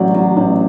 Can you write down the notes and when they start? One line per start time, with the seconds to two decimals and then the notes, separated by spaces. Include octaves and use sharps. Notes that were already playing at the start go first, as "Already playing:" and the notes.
Already playing: A1 F#3 D5
0.14 F#3
0.37 A1